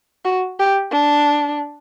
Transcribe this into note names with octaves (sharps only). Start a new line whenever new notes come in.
F#4
G4
D4